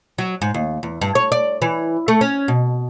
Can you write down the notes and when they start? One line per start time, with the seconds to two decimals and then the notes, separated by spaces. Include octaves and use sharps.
0.18 F#3
0.42 G#2
0.54 D#2
0.83 E2
1.01 G2
1.15 C#5
1.32 D5
1.62 E3
2.08 A3
2.21 C#4
2.48 B2